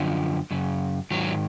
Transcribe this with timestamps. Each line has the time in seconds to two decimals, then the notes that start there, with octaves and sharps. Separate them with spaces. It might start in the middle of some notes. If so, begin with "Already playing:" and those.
Already playing: F#2 D3 F3
0.51 F#2 C#3
1.11 G#2 D#3 F#3